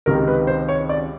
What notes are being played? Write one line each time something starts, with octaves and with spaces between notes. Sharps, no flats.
C#2 C3 D#3 A#4
B4
C5
C#5
D5